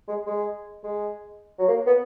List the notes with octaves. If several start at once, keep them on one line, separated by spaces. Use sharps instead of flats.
G#3
G#3
G#3
F#3
A#3
B3